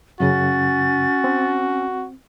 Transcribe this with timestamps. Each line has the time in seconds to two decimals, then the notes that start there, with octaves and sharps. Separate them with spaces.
0.20 F#2 C#3 C#4 F#4 A6
1.24 C4